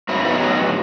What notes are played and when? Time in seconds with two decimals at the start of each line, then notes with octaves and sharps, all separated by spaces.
0.09 F#2 F#3 C4 E4
0.25 B3 D#4
0.40 A2 F#3